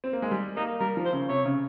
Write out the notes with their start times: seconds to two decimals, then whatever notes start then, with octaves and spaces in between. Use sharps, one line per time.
0.04 C4
0.13 A#3
0.22 G#3
0.31 G3
0.56 A#3 D#4
0.80 G3 A#4
0.97 F3
1.05 C5
1.13 C#3
1.29 C3 C#5
1.46 C#3